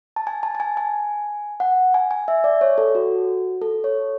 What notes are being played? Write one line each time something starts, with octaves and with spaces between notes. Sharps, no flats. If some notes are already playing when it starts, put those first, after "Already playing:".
A5
G#5
A5
A5
G#5
G#5
F#5
G#5
G#5
E5
D5
C#5
A4
F#4
A4
C#5